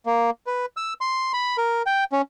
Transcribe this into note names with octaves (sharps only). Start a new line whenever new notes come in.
A#3
B4
E6
C6
B5
A#4
G5
C#4